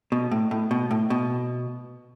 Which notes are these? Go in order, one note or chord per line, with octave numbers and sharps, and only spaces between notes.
B2
A2
A2
B2
A2
B2